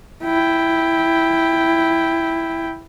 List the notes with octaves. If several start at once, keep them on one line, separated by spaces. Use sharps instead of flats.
E4 G5